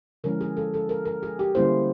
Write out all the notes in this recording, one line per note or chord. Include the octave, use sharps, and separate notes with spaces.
D3 F3 G#3 C#4 E4 A#4
G#4
A4
A4
A#4
A#4
G#4
G4
D3 G3 A#3 C#4 E4 C5